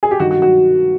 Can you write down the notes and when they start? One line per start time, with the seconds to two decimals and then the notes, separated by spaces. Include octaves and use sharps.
0.03 G#4
0.11 G4
0.20 G2 D#3 F#4
0.31 F#4
0.42 F#4